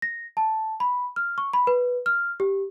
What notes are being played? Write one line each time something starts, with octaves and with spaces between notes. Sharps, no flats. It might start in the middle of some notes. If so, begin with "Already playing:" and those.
A#6
A5
B5
F6
C#6
B5
B4
F6
G4